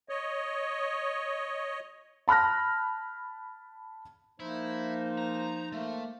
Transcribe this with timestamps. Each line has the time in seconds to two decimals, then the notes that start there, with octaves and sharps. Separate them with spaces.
0.09 C#5 D#5
2.28 A5 B5 F6 F#6 A#6
4.40 F3 A#3 D#4 E4 C5
5.18 A#5
5.72 A3 A#3